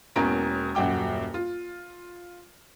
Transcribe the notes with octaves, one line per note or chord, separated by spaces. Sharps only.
E1 E2 A#3 C#4 A#5 D7
D#1 F#2 F#4 G5 D6
F4